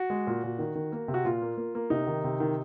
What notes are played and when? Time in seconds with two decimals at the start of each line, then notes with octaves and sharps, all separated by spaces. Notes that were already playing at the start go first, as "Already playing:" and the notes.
Already playing: F#4
0.10 G#3
0.27 A#2
0.43 A#2
0.59 D#3
0.75 D#3
0.92 A#3
1.08 C3
1.14 F#4
1.25 A#2 F4
1.42 A#3
1.57 A#3
1.75 A#3
1.90 C3 D#4
2.07 D#3
2.24 C3
2.40 D#3